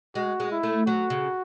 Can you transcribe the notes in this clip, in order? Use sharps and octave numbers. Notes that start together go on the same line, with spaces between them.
G#3 F#4
G#3
E4
A3
F#3 F#4
C#3